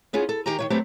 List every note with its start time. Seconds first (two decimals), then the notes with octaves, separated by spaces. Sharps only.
0.13 B3 C#4 F4 G#4
0.29 A4
0.46 D#3 G4 G#5 A#5
0.59 D#3 E3 C#5
0.70 F#3 A3 C4 G4 A4 B4